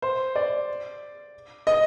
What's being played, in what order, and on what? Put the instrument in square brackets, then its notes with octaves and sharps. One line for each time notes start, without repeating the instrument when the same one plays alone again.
[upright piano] C5
D5
D#5